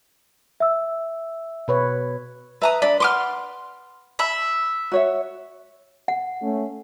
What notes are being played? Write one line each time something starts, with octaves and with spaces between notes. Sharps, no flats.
E5 E6
B2 B4 C#5
B4 E5 A#5 D#6
D4 D5 B5
B4 F#5 C6 D6 F6
E5 B5
F#4 C#5 E5
F#5
A3 C#4